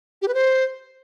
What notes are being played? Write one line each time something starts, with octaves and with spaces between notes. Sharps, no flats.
G4
B4
C5